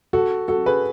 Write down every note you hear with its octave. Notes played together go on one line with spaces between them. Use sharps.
F#4 A4
F#4 A4
G#4 B4